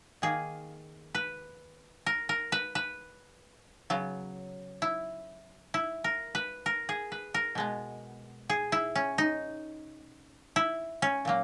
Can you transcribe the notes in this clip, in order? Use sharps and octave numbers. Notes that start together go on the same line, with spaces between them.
D#3 A#3 G#4
B4
A#4
A#4
B4
B4
C#3 F#3 B3
E4
E4
A#4
B4
A#4
G#4
B4
A#4
B2 G#3 B3
G#4
E4
C#4
D#4
E4
C#4
A#2 F#3 A#3